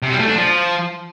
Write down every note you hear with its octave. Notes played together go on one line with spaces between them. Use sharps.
C3
G3
A3
D4
F3